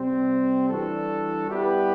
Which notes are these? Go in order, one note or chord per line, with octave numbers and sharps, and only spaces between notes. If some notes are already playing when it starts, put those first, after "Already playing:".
Already playing: C3 G3 C4
E3 G3 D4 F#4 A4
G3 B3 E4 G4 B4